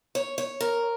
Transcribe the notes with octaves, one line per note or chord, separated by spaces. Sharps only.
C#5
C#5
A#4